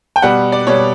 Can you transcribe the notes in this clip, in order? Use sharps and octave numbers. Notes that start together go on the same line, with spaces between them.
G5
B2 G3 F#5
D5
B2 G3 C#5